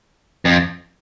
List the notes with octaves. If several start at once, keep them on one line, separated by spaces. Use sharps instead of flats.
F2